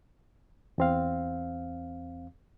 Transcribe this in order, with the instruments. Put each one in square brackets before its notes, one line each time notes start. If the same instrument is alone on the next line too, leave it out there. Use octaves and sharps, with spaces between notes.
[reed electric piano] E2 C4 F5